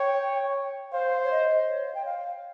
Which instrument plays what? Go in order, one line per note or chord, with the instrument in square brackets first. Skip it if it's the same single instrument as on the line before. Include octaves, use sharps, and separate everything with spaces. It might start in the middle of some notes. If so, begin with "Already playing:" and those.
Already playing: [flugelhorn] C#5 [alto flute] G5
[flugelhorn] C5 [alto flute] F5
[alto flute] C#5
D#5
C#5
G5
F5